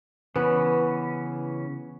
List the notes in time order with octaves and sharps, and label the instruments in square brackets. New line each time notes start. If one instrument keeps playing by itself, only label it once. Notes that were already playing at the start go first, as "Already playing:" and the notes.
[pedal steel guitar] C#3 E3 C#4 [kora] B3